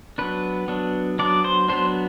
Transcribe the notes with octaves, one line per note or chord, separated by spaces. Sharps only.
F#3 B3 D4 B4
F#3 B3 D4
F#3 B3 D4 D5
C5
F#3 B3 D4 C5